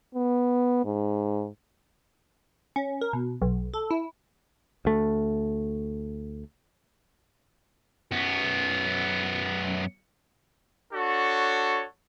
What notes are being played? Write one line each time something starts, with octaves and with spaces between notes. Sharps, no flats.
B3
G#2
C#4
A#4
B2
B1
A4
E4
D2 A3
F#2 B3
D4 F#4 A4 C#5